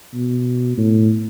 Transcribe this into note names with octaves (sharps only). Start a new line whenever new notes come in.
B2
A2